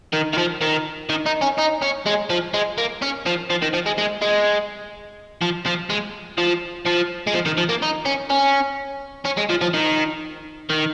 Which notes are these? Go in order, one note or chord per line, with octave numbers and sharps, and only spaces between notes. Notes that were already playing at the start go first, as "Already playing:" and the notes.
D#3
D#3
F3
D#3
D#3
D#4
C#4
D#4
C#4
G#3
F3
G#3
A#3
C#4
F3
F3
D#3
F3
G#3
G#3
G#3
F3
F3
G#3
F3
F3
G#3
F3
D#3
F3
A#3
D#4
C#4
C#4
C#4
G#3
F3
F3
D#3
D#3